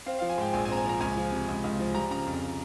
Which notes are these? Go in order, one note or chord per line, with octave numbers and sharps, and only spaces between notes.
C4 F5
F3 F5
G#5
G#2 G5
A#1 G#5
G#5
C4 A#5
G#5
F3 A#5
C#2 G#5
F3
C3
C#2
C#2
F3
G3 A#5
C#3 A#5
F2